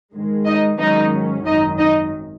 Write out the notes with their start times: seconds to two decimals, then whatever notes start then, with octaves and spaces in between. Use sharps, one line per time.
0.13 G#2 D#3 G#3
0.45 D#4 D#5
0.78 G#2 D#3 F#3 C#4 D#4 D#5
1.45 G#1 F#2 D#3 D#4 D#5
1.78 D#4 D#5